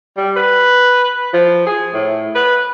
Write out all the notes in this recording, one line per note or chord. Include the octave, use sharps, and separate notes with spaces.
G3
B4
F3
G#4
A2
B4